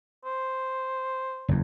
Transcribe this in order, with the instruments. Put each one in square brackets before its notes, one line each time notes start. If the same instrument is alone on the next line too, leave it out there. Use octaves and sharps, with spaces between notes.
[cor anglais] C5
[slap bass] F#1 E2